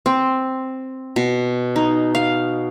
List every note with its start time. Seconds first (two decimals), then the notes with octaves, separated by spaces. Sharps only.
0.06 C4
1.16 B2
1.76 D#4
2.15 F5